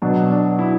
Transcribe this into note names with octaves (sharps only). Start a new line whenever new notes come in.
B2 F#3 D4
D4
E4